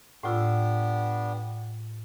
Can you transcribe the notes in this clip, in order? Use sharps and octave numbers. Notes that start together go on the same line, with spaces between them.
A2 B3 D4 F4 G4 E6